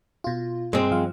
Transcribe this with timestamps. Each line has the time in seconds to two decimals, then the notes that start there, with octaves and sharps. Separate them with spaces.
0.24 B2 F4
0.73 G2 G#3 C4
0.91 G2 F3 F5